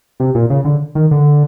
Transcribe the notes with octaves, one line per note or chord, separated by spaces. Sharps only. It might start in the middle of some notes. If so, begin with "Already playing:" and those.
C3
A#2
C#3
D3
D#3
D3